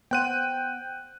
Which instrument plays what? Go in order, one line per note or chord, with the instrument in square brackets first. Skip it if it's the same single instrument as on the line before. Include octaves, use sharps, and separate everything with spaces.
[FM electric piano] B3 C5 F#5 [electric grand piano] G5 F#6 D#7